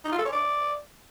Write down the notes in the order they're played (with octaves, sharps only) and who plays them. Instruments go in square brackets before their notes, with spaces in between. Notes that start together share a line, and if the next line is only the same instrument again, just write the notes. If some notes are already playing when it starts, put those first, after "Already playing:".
[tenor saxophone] D#4
F4
A4
C#5
D5